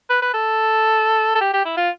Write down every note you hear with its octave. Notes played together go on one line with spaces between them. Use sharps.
B4
B4
A4
A4
G4
G4
E4
F4